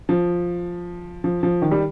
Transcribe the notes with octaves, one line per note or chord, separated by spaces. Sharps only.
F3
F3
F3
D#3
G3